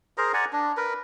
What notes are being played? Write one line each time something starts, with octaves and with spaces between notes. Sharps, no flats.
G#4 A#4 C5 A#5
D5 F#5 G#5 A#5
D4
A#4 B4